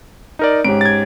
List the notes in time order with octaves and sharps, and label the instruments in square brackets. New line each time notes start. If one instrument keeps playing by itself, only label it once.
[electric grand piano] D#4 A#4 D5
[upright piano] G#2 C#4 G4 [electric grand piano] D7
[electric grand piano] G#6 A6